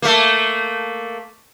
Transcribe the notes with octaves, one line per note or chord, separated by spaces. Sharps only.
A3 A#3